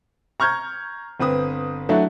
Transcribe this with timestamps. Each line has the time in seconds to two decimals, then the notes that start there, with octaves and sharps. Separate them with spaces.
0.40 A#5 C#6 F6 G6 G#6
1.20 G1 C4 B4 D#6
1.89 F#3 A3 D4 E4 F#4